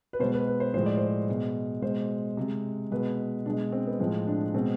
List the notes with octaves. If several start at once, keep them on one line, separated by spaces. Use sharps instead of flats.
B4
B2 G#3 C5
B4
B4
C5
A2 F3 G#3 C5
D5
C5
B2 G#3
B2 G#3 C5
C3 G#3
B2 G#3 B4
B2 G#3 D4
C4
B3
A2 F3 G#3 C4
D4
B2 G#3 C4